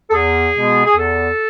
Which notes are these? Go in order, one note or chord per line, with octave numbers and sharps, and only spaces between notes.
A4
E2 G#4
B2 G#3 B3
G#4
E2 A4